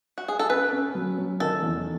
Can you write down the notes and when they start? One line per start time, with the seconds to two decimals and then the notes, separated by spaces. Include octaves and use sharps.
0.18 F#4
0.28 G#4
0.39 A4
0.50 C#4 B4
0.72 C#4
0.95 F#3
1.18 F#3
1.40 D#3 A4
1.62 E2